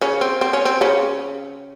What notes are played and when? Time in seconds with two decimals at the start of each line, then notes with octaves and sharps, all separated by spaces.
0.01 C#3 C#4
0.21 C4
0.41 C4
0.53 C#4
0.65 C4
0.81 C#3 C#4